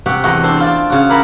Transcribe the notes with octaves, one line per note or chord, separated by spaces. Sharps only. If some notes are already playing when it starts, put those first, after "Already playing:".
C3 F#4 G4 F#5
E2 A3 F#4 D#5
C4 D4 C5
C4 F4 D5
C#3 F#4
E4 G4 A#4 F#5 A5 B5